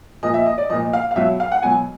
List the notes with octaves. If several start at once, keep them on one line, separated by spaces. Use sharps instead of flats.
A#2 F3 D#5
E5
D#5
D5
A#2 F3 D#5
F5
F5
B2 F#3 E5
F5
F#5
B2 F#3 G#5